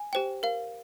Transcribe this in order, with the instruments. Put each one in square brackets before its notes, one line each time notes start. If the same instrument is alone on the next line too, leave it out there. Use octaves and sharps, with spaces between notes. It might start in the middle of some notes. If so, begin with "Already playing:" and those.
Already playing: [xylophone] G#5
G4 C5 G5
A#4 F5